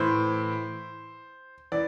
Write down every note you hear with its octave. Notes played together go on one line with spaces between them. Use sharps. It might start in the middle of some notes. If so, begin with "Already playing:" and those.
Already playing: A2 E3 C5
E3 D5